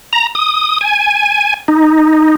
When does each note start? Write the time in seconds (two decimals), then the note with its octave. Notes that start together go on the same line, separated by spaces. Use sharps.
0.13 A#5
0.35 D#6
0.81 G#5
1.68 D#4